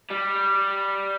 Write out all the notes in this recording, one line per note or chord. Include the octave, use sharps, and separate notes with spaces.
G3